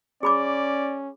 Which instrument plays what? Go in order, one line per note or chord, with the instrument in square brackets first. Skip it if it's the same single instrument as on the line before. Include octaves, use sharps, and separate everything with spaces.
[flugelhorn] C#4 [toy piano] G#4 B5 D6 [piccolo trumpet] D5